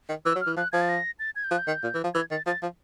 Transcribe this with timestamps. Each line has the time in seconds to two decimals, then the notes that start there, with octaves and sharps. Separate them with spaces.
0.09 D#3
0.25 E3 E6
0.35 F#3
0.41 F6
0.47 E3
0.57 F3 F#6
0.72 F3 G#6
0.81 A6
0.89 A#6
1.19 A6
1.36 G#6
1.44 G6
1.51 F3 F#6
1.59 G6
1.67 D#3
1.83 A#2
1.94 E3
2.04 F3
2.14 E3 G#6
2.31 D#3 A6
2.46 F3 A6
2.62 F3